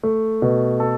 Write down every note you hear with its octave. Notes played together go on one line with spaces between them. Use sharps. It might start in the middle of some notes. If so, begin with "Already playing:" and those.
A3
B2
A4